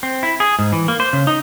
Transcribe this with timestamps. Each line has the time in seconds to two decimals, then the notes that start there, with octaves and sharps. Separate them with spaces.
0.03 C4
0.23 E4
0.40 G#4
0.59 G#2
0.73 E3
0.88 A#3
1.00 C5
1.13 C#3
1.27 D#4